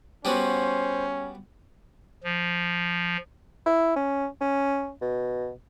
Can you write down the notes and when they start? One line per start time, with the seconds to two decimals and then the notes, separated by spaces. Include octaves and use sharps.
0.25 G3 B3 C#4 F#4 C5
2.24 F3
3.66 E4
3.96 C#4
4.41 C#4
5.02 B2